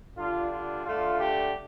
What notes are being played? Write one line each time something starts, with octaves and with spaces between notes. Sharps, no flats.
D3 G3 D4 F4
F4
D3 A3 D4 F4
G4